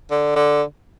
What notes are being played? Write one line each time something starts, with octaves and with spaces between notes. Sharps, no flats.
D3
D3